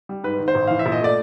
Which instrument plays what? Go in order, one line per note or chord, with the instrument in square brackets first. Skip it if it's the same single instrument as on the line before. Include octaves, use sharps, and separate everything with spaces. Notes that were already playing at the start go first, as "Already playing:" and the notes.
[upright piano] G3
G#2 B4
D#3
C5
A1
E3 F5
E5
A#1
D#5
A3 D5